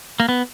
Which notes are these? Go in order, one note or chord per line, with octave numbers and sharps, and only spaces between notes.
A#3
B3